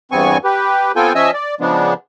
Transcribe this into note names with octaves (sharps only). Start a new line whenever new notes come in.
E2 G2 B3 C4 G#5 C#6
G4 B4
B3 C4 F4 A4 G5 G#5
F3 C#4 D#5 E5 G#5 E6
D5
C#3 F3 G#3 B3 D4